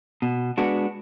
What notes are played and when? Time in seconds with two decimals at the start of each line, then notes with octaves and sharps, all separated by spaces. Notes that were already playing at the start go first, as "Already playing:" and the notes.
0.22 B2
0.58 G#3 B3 D4 F#4